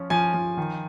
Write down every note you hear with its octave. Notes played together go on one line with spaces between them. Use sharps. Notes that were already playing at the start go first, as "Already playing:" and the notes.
Already playing: F3 C#4
F3 G#5
F3
D#3